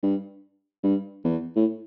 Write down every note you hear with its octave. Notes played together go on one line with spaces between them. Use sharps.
G2
G2
E2
A2